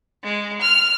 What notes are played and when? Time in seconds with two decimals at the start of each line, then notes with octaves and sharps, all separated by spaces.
0.24 G#3
0.61 F6